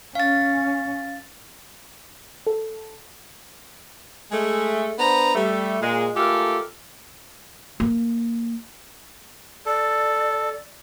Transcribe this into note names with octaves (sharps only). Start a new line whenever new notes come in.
C#4 F5 A6
A4
G#3 A3
B3 D4 C5 A#5
G3 A3
A#2 G#3
G#3 A3 F4 G4 A4 A#4
A#3
A4 D5